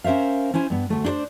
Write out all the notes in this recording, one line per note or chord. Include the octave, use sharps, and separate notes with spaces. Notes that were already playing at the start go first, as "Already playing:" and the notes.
C#4 A#4 C5 E5 F5
C#4 E4 C5 G#5
G2 B3
D2 A3
D4 G4 A#4 C5 D5